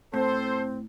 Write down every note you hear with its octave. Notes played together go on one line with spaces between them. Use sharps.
A2 C4 A4 C5